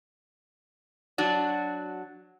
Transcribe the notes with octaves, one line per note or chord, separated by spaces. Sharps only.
F#3 D4 F#4